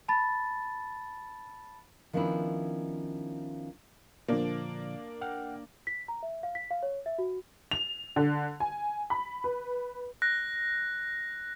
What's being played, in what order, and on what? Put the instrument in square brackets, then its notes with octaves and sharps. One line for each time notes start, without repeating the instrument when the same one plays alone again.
[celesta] A5 B5 A6
[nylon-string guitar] D#3 F3 B3 C#4 D4 E4
[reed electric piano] A#2 D3 F3 [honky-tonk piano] A#3 D4
[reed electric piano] F#5 G5 F6
[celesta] B6
A#5
E5
F5
B6
F5
C#5
E5
F#4
[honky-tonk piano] F7
D3
G#5
B5
B4
[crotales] F#6 A#6